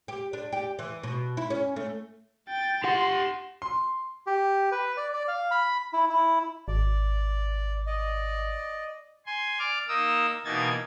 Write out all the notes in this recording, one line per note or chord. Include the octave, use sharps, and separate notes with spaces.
G4
D4
G4
E3
B2
E4
C#4
A3
G5 A6
G4 F#5 C6
C6
G4
B4
D5
D5
F5
B5
E4
E4
G#1 D5
D5 D#5
G#5 C6
D5 D6 F6
A#3 D#4 D#6 E6
B2 E3 A#3 D#4 G#6 A6